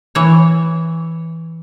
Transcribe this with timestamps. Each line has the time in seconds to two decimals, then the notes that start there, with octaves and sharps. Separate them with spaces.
0.15 E3 C#5